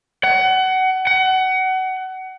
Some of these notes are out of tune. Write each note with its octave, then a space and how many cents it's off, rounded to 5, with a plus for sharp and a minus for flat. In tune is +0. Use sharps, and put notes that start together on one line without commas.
F#5 +25
F#5 +25